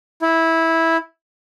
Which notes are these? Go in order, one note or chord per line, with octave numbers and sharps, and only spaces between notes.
E4